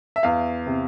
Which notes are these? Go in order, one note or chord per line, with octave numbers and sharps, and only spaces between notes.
E5
E2 F5
C3